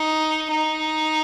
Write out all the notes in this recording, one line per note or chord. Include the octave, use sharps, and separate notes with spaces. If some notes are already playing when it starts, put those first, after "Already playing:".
Already playing: D#4
D#4